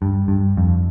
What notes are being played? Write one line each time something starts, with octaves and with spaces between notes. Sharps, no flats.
G2
G2
F2